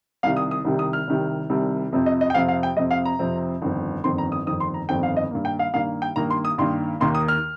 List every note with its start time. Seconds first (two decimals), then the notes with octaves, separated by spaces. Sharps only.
0.23 C2 C3 D#3 G3 F5
0.37 D#6
0.51 D#6
0.65 C2 C3 D#3 G3
0.79 D#6
0.93 F6
1.08 C2 C3 D#3 G3
1.50 C2 C3 D#3 G3
1.92 F2 C3 F3 C4
2.06 D#5
2.21 D#5
2.30 G5
2.34 F2 C3 F3 C4 F5
2.48 F5
2.63 G5
2.77 F2 C3 F3 C4 D#5
2.91 F5
3.05 A#5
3.19 F2 C3 F3 C4
3.62 G1 F2 D#3 C4
4.04 G1 F2 D#3 C4 C6
4.18 A#5
4.32 D#6
4.46 G1 F2 D#3 C4 D#6
4.60 C6
4.74 A#5
4.89 G1 F2 D#3 C4 G5
5.03 F5
5.17 D#5
5.31 G2 D#3 A#3
5.45 G5
5.59 F5
5.74 G2 D#3 A#3 F5
6.02 G5
6.16 G2 D#3 A#3 A#5
6.30 C6
6.45 D#6
6.58 G2 D#3 A#3 C6
7.00 D#2 D#3 A#3 C6
7.15 D#6
7.28 F6